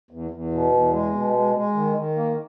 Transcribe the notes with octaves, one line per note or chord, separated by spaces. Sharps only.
E2
E2
B2
E2
G#3
B2
G#3
G#3
D#3
D#3
A#3